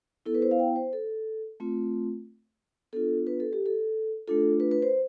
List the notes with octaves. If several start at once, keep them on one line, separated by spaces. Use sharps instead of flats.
B3 E4 A4
B4
C5
F5
G5
C5
A4
A3 C4 F4
B3 D4 F4 A4
B4
A4
G4
A4
A3 D4 F4 A4
B4
B4
C5